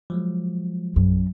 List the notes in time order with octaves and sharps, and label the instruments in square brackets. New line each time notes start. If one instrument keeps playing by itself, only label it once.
[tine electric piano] F3 F#3 G#3
[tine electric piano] A#1 [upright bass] F#2